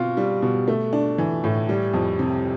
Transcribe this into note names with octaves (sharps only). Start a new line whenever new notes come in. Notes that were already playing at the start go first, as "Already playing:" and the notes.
Already playing: B2 C4 F4
G3
B2
A3
D4
E3
A2
G3
F2
C3